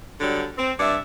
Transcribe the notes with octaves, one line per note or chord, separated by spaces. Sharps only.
D3 F#3 G3
C4
G2 D5 E5